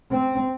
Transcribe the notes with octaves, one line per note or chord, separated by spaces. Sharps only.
C4